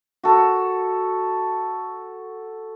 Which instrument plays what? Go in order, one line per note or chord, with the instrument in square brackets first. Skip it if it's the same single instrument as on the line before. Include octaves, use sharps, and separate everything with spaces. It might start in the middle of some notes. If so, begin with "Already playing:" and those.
[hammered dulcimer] F#4 A4